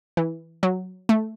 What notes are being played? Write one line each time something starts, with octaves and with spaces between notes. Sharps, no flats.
E3
F#3
A3